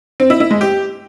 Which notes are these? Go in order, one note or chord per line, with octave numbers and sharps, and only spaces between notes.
C4
E4
E4
G#3
G4